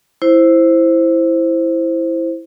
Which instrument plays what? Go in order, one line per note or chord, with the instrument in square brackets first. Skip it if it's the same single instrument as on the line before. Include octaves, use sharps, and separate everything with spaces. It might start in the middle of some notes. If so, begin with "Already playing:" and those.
[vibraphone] E4 C5